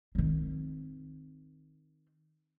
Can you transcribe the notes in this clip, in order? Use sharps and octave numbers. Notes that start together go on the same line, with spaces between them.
D#3 C4